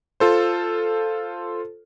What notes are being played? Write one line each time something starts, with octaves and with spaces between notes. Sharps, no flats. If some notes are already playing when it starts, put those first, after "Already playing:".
F4 A4 C5